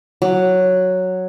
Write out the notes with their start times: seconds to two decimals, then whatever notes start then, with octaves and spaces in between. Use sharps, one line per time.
0.22 F#3